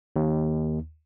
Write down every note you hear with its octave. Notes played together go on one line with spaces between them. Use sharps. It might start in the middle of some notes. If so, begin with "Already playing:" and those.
D#2